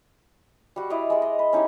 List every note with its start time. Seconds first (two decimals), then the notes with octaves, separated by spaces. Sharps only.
0.76 G3 F#4
0.90 E4 D5 D#5 F5
1.10 G#3 D5
1.22 D#5
1.39 B4
1.53 C#4 D#4 E4 G4